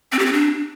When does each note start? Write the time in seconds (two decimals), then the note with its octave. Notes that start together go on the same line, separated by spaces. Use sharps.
0.12 C4
0.19 G4
0.26 C4
0.33 D4